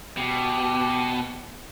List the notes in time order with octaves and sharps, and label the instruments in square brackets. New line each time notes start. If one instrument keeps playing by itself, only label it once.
[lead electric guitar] B2 [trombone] G4